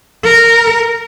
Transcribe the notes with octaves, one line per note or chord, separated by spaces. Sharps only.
A#4